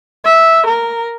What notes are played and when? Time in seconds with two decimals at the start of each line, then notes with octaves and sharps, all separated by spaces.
0.25 E5
0.66 A#4